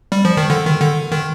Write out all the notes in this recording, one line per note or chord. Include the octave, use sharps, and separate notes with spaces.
G3
F3
D#3
D3
D#3
D3
D#3